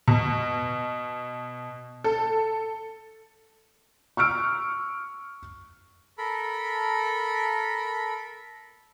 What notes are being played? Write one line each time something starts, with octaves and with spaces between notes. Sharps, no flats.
B2
A4
C#6 E6 F6 D7
A4 A#4 B5